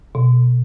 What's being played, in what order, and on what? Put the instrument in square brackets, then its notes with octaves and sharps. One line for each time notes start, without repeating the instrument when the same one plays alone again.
[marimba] B2